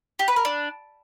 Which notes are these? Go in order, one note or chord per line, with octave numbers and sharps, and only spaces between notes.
G4
B4
A#4
D4